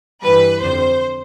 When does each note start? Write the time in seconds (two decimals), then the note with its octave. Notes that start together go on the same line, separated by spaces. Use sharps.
0.23 G2 E3 G3 B4
0.62 F2 D3 G3 C5